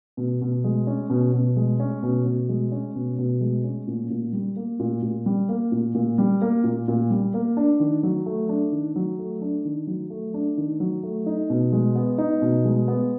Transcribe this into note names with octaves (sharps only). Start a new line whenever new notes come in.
B2
B2
G#3
C#4
B2
B2
G#3
C#4
B2
B2
G#3
C#4
B2
B2
G#3
C#4
A#2
A#2
G3
A#3
A#2
A#2
G3
A#3
A#2
A#2
G3
A#3
A#2
A#2
G3
A#3
D4
D#3
F#3
A3
D4
D#3
F#3
A3
D4
D#3
F#3
A3
D4
D#3
F#3
A3
D#4
B2
G#3
B3
D#4
B2
G#3
B3